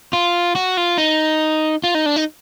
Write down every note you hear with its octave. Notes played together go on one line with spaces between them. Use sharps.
F4
F#4
F4
D#4
F4
D#4
D4
D#4